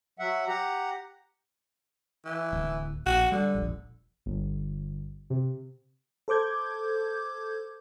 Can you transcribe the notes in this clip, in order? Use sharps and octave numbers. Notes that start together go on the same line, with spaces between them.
F#3 E5 F#5
G4 F#5 A#5
E3
D1
A#1 F#4
D3 G3
E1 A#1
G1
C3
A4 C5 D6 G6 G#6